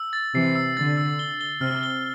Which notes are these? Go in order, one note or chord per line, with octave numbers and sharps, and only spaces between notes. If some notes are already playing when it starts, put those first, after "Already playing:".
Already playing: E6
A6
C3 E3 C7
E6
D3 A6
E6
G7
G7
C3 F6
G7